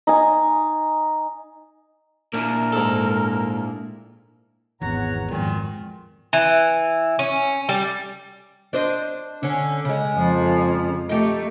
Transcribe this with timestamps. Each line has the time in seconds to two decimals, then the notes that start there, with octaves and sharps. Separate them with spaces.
0.07 D#4 G#5
2.34 A#2 A#3 D4 E4 A#4
2.73 G#2 A4
4.82 G#1 E2 C#5 F#5 A#5
5.28 G#1 F2 A#2 D#3 F#3 G#3
6.33 E3
7.19 C#4
7.69 G3
8.73 D4 C5 D#5
9.43 D3 C#4
9.85 C#3 G#3
10.16 F2 F3
11.09 A3 D#4 G4